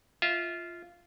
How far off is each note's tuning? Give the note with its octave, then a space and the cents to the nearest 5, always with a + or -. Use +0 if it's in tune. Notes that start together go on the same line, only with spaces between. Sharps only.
F4 -10 E5 -25